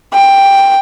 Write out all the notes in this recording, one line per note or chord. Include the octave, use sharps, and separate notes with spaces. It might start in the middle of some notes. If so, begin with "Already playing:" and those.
G5